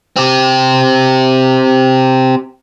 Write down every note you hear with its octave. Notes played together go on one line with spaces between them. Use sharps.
C4 G4